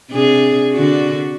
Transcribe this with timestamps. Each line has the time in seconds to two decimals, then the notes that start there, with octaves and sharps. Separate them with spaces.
0.11 C3 D4 G#4
0.73 D3 D4 F#4